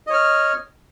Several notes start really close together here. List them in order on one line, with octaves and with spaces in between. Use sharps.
D#5 C#5 F6